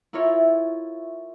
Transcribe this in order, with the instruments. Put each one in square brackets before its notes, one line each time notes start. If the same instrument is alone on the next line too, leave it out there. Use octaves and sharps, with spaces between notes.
[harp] E4 F4 A4 A#4 C#5